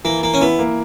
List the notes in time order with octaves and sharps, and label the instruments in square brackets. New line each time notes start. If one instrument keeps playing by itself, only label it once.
[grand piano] E3 [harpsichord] A#3
[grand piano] E3 [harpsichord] A#3
[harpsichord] C#4
[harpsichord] B3 [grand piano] E4
[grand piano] A#3